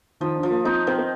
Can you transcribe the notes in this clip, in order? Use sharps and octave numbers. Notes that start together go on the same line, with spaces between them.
D#3 F3 D#4
D4
F3
A#3 A#4
C4 D#4 C5
D#3 C4 C5
C4 C5